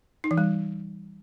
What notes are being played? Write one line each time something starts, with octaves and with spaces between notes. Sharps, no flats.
D#4
E3
G3